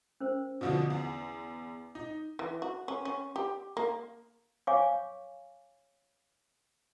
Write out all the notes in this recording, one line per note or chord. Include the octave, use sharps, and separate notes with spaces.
C#4 A#4 C5
B2 D3 F3
E2
D#4
E3
F#4
C#4
C#4
G4
A#3
C#5 F5 G#5 C#6 D6